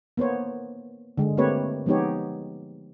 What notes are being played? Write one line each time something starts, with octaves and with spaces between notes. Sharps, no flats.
A#3 B3 C5 C#5
D3 G#3
A3 A#3 C4 G4 B4 C#5
F3 G#3 B3 D#4 G4 C#5